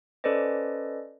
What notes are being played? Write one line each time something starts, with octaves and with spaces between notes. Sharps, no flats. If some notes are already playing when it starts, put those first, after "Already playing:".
C#4 A4 B4 C5 D5 D#5